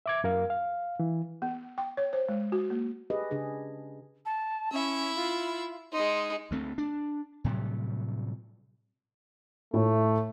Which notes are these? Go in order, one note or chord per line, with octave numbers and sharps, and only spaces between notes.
E5 D6 G#6
F#2 A#4 F5
F5
E3
B3
G5
C#5
C5
G#3
F#4
A#3
G4 G#4 B4 D#5
C#3 D4 G#4
A5
C#4 E4 E5
F4
G#3 D#4 C6
D2 A3 C4
D4
A2 C3 F#3 G3
A2 A3